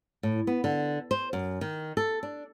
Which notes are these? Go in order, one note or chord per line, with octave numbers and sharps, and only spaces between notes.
A2
B3
D3
C5
F#2
D#3
A4
D4